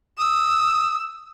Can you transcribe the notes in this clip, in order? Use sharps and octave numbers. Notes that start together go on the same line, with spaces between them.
D#6 E6